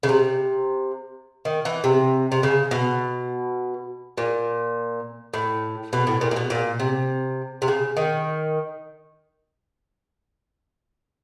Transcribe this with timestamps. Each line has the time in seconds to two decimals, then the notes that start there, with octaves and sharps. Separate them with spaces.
0.03 C#3
0.09 C3
1.45 D#3
1.65 E3
1.84 C3
2.32 C3
2.43 C#3
2.71 B2
4.18 A#2
5.34 A2
5.93 B2
6.07 A2
6.21 A#2
6.31 A#2
6.36 B2
6.50 A#2
6.79 C3
7.62 C3
7.68 C#3
7.97 D#3